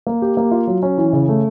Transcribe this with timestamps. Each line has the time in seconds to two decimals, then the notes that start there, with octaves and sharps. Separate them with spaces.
0.07 A#3
0.22 G4
0.37 A#3
0.51 F4
0.67 F#3
0.83 C#4
0.98 E3
1.13 C#3
1.28 A3